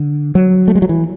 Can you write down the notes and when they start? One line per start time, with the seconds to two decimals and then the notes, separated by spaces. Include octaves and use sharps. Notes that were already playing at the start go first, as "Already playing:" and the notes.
Already playing: D3
0.35 F#3
0.68 A3
0.75 G#3
0.82 F#3
0.89 E3